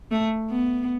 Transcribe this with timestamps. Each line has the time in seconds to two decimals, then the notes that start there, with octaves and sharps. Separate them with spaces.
0.11 A3
0.51 B3